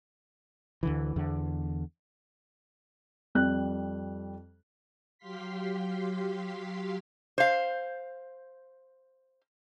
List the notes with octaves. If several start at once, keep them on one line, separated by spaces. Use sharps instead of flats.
D2 D3 E3
E2 D3
F2 G3 F#6
F#3 G4 F5 C6 B6
C5 F5